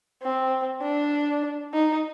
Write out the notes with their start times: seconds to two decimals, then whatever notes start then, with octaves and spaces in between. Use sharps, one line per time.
0.22 C4
0.82 D4
1.74 D#4